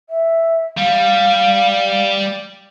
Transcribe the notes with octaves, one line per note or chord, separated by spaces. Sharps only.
E5
G3 F5